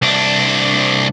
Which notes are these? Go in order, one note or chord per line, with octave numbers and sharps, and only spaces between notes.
C2 D4